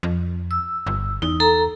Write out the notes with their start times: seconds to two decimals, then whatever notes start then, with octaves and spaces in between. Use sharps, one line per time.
0.03 F2
0.51 E6
0.87 G1
1.22 E2 D#4
1.40 A4 A#5